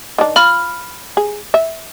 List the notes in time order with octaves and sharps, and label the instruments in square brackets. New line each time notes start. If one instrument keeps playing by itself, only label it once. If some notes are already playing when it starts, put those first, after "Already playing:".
[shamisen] D#3 D4
[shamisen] F4 [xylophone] B5 F6
[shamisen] G#4
E5